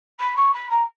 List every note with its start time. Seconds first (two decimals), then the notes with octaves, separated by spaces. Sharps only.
0.19 B5
0.36 C#6
0.53 B5
0.70 A#5